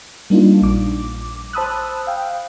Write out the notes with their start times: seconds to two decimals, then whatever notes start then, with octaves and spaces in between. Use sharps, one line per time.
0.30 G3 A#3 D4 D#4 F4
0.62 A#1 D6
1.53 C5 A5 B5 D#6 E6 F#6
2.07 F5 G5